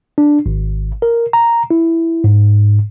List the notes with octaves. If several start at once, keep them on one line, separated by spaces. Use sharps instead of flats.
D4
G#1
A#4
A#5
E4
G#2